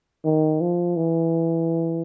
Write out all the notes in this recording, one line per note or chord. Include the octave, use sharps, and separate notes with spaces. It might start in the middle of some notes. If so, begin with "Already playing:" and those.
D#3
F3
E3